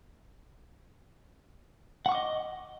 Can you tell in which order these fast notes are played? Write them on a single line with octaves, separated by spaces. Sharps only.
F#5 C#6 D6 D#5